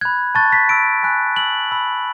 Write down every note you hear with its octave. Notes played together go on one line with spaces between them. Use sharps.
B5 F#6 G#6
A5 C#6 F#6 A6
B6
B5 E6 D7
G#5 B5 F#6
B5 E6 F#7
B5 E6